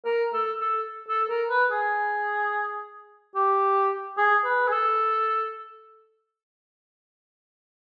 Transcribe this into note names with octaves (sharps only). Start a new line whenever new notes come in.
A#4
A4
A4
A4
A#4
B4
G#4
G4
G#4
B4
G#4
A4